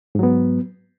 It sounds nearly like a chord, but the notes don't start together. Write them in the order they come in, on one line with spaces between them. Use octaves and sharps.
G#2 F#3 B3